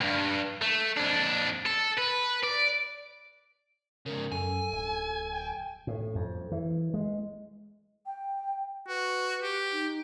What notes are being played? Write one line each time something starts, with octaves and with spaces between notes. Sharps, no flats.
D2 G2
A3
F2 D4
A4
B4
D5
G#2 C#3 A#4
F#2 A4 G#5
D1
G5
A2
F2
E3
G#3
G5
F#4 B4
G4
D#4